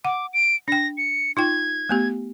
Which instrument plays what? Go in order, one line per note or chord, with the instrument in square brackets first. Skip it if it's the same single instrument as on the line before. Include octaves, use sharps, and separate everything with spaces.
[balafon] F#5 [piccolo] D6
[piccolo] D7
[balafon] D4 G5 [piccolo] A#6
[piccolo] C#7
[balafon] D#4 F4 G5 [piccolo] G#6
[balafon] A3 B3 G4